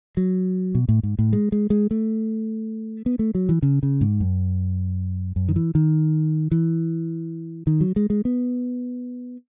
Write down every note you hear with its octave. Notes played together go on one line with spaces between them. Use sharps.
F#3
B2
A2
G#2
A2
G#3
G#3
G#3
A3
B3
A3
F#3
E3
C#3
C#3
G#2
F#2
F#2
D#3
E3
D#3
E3
D#3
F#3
G#3
G#3
B3